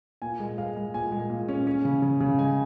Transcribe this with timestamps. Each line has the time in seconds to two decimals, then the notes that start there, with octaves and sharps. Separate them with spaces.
0.22 A#2 G#5
0.40 G#3
0.58 G#3 F5
0.77 G#3
0.94 A#2 G#5
1.12 G#3
1.30 A#2
1.48 C#4
1.67 C#4
1.85 C#3
2.02 C#3
2.20 C#3
2.38 G#3 G#5